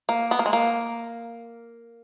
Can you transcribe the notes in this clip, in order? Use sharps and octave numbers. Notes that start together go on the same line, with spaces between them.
A#3
B3
A#3
G#3
A#3